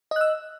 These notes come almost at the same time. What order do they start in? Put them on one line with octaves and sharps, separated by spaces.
D#5 F#6 E6